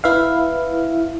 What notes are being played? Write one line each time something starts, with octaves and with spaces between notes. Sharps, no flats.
E4 B4 E5 F5